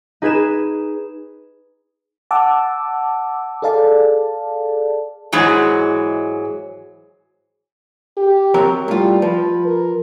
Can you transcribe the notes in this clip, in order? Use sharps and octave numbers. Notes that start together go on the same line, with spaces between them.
D#4 G#4 B4 G#6 D#7 E7
F#5 A5 D6 E6
G#4 A4 D5 F5 A5
G#2 E3 F#3 G#3
G4
F#3 C4 A#4
A2 G3 F4
F3 B4
A#4